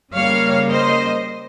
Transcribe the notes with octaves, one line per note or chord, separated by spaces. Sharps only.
C#3 G3 A#3 C#5 F5
C5 D#5